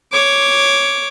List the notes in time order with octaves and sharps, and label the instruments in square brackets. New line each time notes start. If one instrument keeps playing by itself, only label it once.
[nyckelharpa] C#5 D6